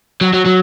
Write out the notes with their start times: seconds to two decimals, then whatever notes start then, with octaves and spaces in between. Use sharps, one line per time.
0.21 F#3
0.33 F#3
0.46 F#3